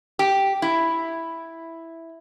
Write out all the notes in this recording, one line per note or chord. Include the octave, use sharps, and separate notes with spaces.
G4
E4